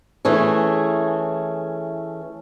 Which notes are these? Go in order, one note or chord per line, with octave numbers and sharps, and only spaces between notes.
E3 A3 C#4 G#4